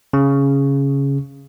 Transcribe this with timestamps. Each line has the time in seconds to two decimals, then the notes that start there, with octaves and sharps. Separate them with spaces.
0.13 C#3